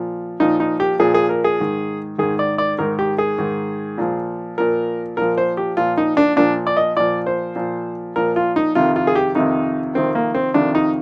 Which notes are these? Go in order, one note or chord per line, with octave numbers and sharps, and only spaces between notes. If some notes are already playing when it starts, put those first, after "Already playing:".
Already playing: A#2 F3
A#2 F3 D#4
D#4
G4
A#2 F3 G#4
G#4
A#4
G#4
G#2 D#3
G#2 D#3 G#4
D5
D5
G#2 D#3 A#4
G4
G#4
G#2 D#3
A#2 F3
A#2 F3 A#4
A#2 F3 A#4
C5
G4
A#2 F3 F4
D#4
D4
A#2 F3 D4
D5
D#5
A#2 F3 D5
C5
A#2 F3
A#2 F3 A#4
F4
D#4
F2 C3 D#3 F4
F4
G#4
G4
F2 C3 D#3 D#4
F2 C3 D#3 C4
A#3
C4
F2 C3 D#3 D4
D#4